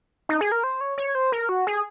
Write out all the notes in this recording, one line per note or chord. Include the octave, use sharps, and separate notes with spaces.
D#4
G#4
A#4
C5
C#5
C#5
C5
A#4
F#4
G#4